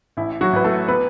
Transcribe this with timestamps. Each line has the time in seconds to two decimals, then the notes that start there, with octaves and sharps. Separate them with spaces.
0.17 A1 E4
0.41 F#3 F#4
0.53 A1 B4
0.64 A3 A4
0.88 B3 B4